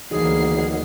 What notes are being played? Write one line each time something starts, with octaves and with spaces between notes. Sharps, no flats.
D2 D#3 E3 F#3 A#3 G#4 C7